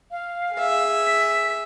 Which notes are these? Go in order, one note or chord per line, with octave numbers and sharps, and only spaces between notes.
F5
G#4 E5
B6